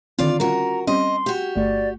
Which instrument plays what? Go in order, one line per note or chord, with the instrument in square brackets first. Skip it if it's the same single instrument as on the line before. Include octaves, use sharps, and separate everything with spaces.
[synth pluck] D3 D#3 C4 [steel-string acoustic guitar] F4 D5
[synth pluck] G3 C#4 F4 [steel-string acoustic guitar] F#4 A#4 [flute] A#5
[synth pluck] G3 C4 C#4 [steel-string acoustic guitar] D#5 [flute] C6
[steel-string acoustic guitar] F#4 G4
[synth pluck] G1 A3 C#6 [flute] D5